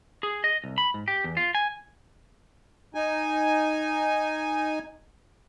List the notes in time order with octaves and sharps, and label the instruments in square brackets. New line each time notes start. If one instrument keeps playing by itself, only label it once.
[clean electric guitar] G#4
D#5
C2
B5
G#2
G4
E2
F4
G#5
[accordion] D#4 G#5